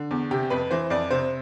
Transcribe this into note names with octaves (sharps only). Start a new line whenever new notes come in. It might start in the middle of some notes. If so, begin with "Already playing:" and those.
Already playing: D3
E2
C3 G4
F2 B4
E3 C5
F2 D5
C3 C5